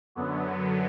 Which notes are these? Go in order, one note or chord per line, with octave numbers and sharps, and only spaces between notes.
F#2 D3 F#3 B3